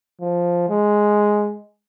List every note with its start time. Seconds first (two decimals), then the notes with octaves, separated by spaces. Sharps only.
0.21 F3
0.69 G#3